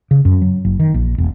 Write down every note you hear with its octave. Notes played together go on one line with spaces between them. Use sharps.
C#3
F#2
F#3
F#1
D#3
A#1
E1